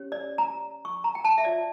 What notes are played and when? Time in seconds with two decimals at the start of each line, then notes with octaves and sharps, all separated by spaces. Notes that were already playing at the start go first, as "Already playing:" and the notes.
Already playing: C#4 G4 C#5
0.12 D5
0.38 A#5
0.85 C#6
1.04 A#5
1.15 G5
1.24 A5
1.38 E5
1.44 F4 C#5 D5